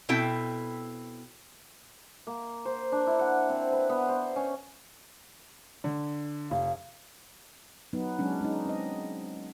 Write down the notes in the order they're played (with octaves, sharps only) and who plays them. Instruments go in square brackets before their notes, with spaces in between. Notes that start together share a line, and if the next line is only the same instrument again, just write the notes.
[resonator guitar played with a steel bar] B2 C4 E4 A4 G5
[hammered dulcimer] A#3
C5
D4
E4
F#5
C4
B4
B3
C5
C#4
[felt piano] D3
[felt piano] F1 [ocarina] F5
[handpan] F#3 B3 D#4
F#3 G#3 C#4 D4
G#3 D#4
C4 D#5